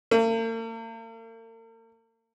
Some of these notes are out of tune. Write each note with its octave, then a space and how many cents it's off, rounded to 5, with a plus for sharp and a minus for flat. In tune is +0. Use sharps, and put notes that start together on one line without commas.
A#3 -45